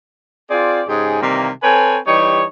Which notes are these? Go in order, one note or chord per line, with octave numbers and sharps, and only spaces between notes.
C4 F4 G#4 D5
G#2 C#3 G#3 G4 G#4
C3 D#3 E3 G3 A#3
C4 A4 B4 C#5 G#5
E3 G3 D#4 G4 C#5